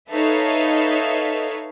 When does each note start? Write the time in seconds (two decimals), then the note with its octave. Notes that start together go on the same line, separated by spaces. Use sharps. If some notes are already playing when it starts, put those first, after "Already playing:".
0.10 D#4 A4 B4 C#5 E5 F5